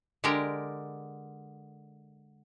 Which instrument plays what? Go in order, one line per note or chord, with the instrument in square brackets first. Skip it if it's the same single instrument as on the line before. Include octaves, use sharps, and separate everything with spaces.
[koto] D3 G#3 G4 A#4 D5